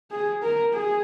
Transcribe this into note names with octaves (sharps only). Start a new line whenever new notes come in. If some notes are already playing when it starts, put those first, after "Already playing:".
G#4
A#4
G#4